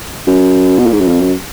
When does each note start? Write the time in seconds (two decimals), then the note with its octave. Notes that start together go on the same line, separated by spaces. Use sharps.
0.27 F#2
0.79 B2
0.86 A#2
0.93 G#2
1.00 F#2
1.08 F2
1.21 F#2